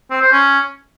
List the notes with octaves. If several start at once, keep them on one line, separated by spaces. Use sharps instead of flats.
C4
C5
C#4